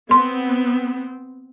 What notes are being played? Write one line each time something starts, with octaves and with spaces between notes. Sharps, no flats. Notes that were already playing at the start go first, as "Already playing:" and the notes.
B3 C4 C6